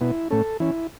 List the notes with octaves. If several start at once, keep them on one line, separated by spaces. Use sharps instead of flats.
B2 B3 E4
A2 A3 C#4 A4
E3 C#4 E4